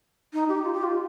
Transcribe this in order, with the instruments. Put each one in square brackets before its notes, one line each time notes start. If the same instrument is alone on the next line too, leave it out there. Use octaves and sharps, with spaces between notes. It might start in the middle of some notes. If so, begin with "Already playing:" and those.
[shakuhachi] D#4
G4
F4
G4
F4